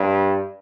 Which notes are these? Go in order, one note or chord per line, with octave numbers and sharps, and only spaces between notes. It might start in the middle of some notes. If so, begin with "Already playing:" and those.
Already playing: G2